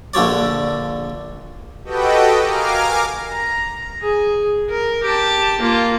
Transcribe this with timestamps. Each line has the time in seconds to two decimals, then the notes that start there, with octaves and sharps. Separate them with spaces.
0.14 A#1 D3 F3 C#5 D5
1.84 F#4 G4 A4 B4 D#5 G5
2.44 A#4 F5 G#5 A#5 D6 F6
3.32 A#5
4.01 G#4
4.70 A#4
5.04 G4 A5
5.61 A#3 F4